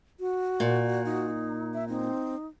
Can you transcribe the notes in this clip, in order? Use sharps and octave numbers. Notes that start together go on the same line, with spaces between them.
F#4
A#2 D5
D#4
E5
C4 D#4